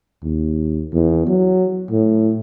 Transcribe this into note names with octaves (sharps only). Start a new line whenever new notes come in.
D#2
E2
F#3
A2